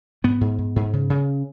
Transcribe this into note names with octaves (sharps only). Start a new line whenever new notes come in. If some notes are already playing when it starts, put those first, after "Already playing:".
G#2 B3
G#2
G#2
G#2
C#3
C#3